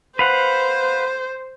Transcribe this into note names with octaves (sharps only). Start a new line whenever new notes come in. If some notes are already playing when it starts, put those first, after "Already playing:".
B4 C5 F5 F#5